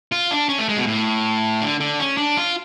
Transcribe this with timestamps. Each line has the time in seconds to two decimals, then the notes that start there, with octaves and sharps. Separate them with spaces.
0.12 F4
0.31 D4
0.49 C#4
0.58 A3
0.69 G#3
0.77 B2
0.87 A2
1.61 D3
1.80 D3
2.00 C#4
2.17 D4
2.37 F4